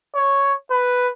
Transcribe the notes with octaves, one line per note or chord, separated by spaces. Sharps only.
C#5
B4